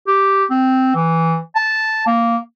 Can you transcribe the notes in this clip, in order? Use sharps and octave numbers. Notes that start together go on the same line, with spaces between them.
G4
C4
E3
A5
A#3